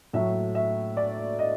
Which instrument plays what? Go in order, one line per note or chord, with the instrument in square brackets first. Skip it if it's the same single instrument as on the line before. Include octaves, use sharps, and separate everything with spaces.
[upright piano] A2 F#3 A3 E5
E5
D5
D#5